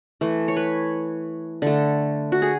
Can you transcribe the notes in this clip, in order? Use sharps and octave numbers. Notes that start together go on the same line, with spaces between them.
E3 A3
C#5
B4
D3 A3
F#4
G#4